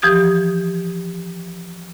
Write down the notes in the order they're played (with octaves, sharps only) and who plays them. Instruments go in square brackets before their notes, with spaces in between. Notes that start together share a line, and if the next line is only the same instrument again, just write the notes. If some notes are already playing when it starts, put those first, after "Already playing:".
[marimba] E3 F3 G4 D#6 G#6